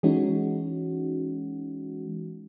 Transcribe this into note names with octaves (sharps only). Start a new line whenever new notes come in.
E3 G#3 C#4 D#4 F#4